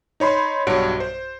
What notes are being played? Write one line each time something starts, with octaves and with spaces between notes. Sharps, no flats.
D#4 C#5 B5 C6
B1 G2 F#4 C#5 D7
C5